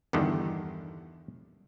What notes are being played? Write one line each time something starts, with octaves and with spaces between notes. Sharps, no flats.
E2 G2 D3 D#3